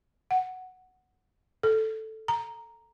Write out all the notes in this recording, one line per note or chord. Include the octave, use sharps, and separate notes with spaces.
F#5
A4
A#5